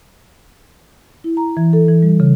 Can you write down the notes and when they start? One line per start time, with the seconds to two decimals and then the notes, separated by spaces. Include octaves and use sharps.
1.24 E4
1.37 A#5
1.57 E3
1.73 A4
1.89 E3
2.03 G3
2.20 C#3